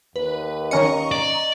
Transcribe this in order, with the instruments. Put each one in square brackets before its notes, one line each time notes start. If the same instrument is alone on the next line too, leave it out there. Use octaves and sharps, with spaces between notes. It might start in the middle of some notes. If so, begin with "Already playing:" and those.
[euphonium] D#2 [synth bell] B4
[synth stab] D#3 C#4 C#7 [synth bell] D#5 A#5 C#6
[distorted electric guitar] D5